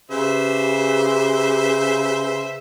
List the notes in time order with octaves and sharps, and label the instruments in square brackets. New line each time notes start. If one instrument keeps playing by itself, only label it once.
[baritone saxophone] C#3 [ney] G4 [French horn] B4 [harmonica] C5 E5